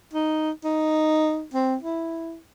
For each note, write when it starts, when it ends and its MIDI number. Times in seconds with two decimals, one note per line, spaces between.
0.13 0.51 63
0.64 1.45 63
1.54 1.76 60
1.83 2.37 64